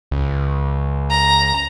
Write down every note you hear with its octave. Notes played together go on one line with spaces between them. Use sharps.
C#2
A#5